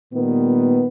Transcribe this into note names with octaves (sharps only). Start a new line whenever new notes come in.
A#2 D#3 G3 B3